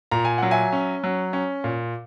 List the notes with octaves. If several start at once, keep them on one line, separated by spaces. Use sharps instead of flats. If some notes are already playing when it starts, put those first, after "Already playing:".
A#2 A#5
G#5
F#3 F#5
E5 G#5
C#4
F#3
C#4
A#2